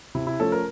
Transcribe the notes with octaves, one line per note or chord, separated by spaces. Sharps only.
C3 E4
E4
F3 A3 C#4 A4
A#4